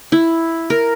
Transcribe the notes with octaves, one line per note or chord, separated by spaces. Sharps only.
E4
A#4